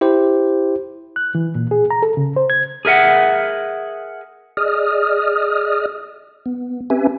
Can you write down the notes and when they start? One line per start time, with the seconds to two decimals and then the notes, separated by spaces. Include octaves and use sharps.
0.01 E4 G4 C5
1.16 F#6
1.35 E3
1.55 A#2
1.71 G#4
1.91 A#5
2.03 A4
2.17 C#3
2.36 C5
2.50 G#6
2.85 G#4 A#4 E5 F#5
4.57 G#4 D5 D#5 D#6 F6
6.46 B3
6.90 C4 C#4 G4 B4 E5 G#5